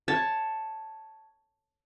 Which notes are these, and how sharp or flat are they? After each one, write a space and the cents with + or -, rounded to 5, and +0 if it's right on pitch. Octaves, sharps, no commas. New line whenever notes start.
C#5 +0 A5 +0